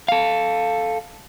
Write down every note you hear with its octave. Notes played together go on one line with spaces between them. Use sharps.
A4 F5